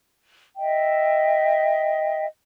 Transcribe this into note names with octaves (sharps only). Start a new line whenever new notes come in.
D#5 E5 G5